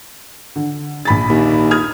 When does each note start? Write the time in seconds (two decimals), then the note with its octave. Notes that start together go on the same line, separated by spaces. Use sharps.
0.56 D3
1.05 A#1 B5 A6
1.29 D#2
1.71 D#6 F6 G#6